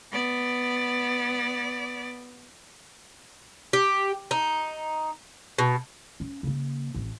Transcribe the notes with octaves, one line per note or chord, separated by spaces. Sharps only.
B3 D5
G4
D#4
B2
C#4
C#3 A#3
A1 C4